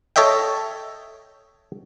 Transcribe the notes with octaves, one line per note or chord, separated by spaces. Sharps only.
A4 C#5 D#5 E5 G5